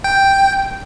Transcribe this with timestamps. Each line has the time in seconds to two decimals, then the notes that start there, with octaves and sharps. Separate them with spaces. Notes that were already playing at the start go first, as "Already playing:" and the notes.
0.04 G5